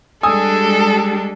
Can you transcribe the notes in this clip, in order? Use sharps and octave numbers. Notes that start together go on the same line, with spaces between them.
G3 G#3 D4 A4 G#5 D#6 E6